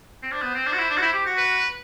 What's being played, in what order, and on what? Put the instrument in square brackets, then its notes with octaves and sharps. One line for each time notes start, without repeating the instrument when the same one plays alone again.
[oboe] C4
[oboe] D4 [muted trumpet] C5
[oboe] B3
C4
D4
F#4
E4
D4
F#4
E4
G4
F#4
[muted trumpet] B4